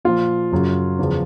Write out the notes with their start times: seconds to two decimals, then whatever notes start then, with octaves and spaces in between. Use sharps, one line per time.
0.05 A#2 F3 F4
0.52 F#2 C#3 F#3
0.99 E2 C#3 F3